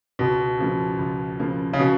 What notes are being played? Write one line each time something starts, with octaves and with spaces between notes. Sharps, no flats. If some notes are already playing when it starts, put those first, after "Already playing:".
C#2 B2
C#3 F3 A#3
C#2
C#3 F3 A#3
C#3
B2